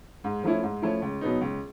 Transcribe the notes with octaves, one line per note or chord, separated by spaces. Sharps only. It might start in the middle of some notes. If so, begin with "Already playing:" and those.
G#2
F3 A3 C#4 E4
G#2
F3 A3 C#4 E4
C#2
B2 F#3 B3 D#4
C#2